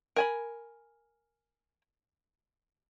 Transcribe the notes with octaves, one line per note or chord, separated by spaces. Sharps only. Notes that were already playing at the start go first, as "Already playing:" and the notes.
A#4 G#5 B5